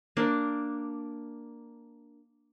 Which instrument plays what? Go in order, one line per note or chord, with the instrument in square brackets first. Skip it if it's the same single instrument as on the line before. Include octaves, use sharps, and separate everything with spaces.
[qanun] A#3 D4